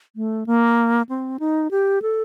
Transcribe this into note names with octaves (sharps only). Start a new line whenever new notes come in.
A3
A#3
C4
D#4
G4
A4